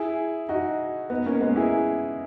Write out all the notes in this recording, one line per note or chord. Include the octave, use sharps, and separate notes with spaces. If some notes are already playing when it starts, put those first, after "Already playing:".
Already playing: E4 G#4
D#4 F#4
B3 D#4
A#3 C#4
G#3 B3
E4 G#4